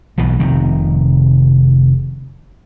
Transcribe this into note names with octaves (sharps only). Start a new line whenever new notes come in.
B1 B2 E3
F1 C3 D#3